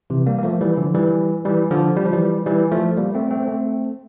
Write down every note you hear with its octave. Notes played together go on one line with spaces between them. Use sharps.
C3 E3
G3 A#3
A#3
F3 A3
E3 G3
D3 F3
E3 G3
E3 G3
D3 F3
G3
F3
E3 G3
E3 G3
F3 A3
G3 A#3
A3 C4
A3 C4
A3 C4